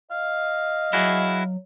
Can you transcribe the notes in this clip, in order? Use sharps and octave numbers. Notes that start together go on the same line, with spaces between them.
D#5 F5
F#3 E4 F#4 G#4